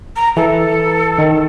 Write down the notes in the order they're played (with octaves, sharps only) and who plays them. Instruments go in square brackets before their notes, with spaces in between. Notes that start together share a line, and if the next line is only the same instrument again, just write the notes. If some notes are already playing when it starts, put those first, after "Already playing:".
[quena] A#5
[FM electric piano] E3 [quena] A4
[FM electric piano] D#3